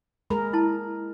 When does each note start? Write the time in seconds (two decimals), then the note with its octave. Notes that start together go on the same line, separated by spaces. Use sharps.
0.30 G#3 G#4 A#4 B5
0.53 E4 A5